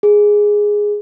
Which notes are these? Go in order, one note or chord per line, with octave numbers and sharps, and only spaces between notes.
G#4